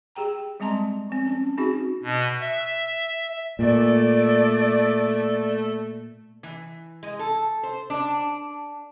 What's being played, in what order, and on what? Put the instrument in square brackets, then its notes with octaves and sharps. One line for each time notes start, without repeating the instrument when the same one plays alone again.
[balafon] G4 G#4 G5 A#5
G3 G#3 C4 A5 A#5 C6
F3 C4
C#4
C4 D#4 F#4 G#4
[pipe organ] B2
E5
[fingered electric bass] A#2 [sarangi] A3 [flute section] D5
[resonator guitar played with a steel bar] E3
G#3
A4
C5
D4